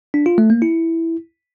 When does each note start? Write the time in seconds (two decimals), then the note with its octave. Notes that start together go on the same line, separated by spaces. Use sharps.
0.14 D4
0.26 F4
0.38 A3
0.50 A#3
0.62 E4